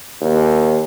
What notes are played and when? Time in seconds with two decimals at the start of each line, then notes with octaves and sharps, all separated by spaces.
0.21 D#2